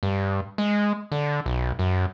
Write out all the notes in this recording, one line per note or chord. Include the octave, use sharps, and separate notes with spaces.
G2
G#3
D3
B1
F#2